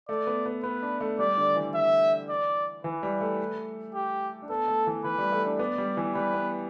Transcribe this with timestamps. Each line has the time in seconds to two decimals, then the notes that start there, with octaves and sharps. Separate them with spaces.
0.09 A3 D5
0.27 B3
0.46 B3
0.64 B3 B4
0.82 D4
1.01 A3
1.19 G3 D5
1.38 D3
1.56 E3
1.74 E3 E5
2.30 D5
2.84 E3 B4
3.03 G3
3.21 A3
3.94 G4
4.42 D4
4.49 B3 A4
4.68 A3
4.87 E3
5.04 E3 B4
5.18 G3
5.32 A3
5.46 D4
5.59 B3 D5
5.78 G3
5.97 E3
6.15 G3 B4
6.34 B3